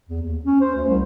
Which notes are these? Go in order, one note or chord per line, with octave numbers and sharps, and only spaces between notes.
E2
D#2
C#4
C5
D2
C2